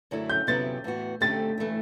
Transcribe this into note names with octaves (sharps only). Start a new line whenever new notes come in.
F#2 D3 F#3 A3 E4
G6
C3 F#3 B3 E4 G4 A6
A2 E3 B3 F#4
D3 A3 C4 G4 A6
E3 A3 E4